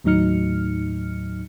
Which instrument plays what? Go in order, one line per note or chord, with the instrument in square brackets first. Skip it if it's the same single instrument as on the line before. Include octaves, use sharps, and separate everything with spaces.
[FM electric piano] D#2 A2 F#3 D#4 F6 C#7